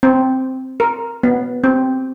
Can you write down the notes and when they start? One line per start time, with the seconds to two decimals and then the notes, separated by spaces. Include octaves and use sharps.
0.03 C4
0.80 A#4
1.23 B3
1.64 C4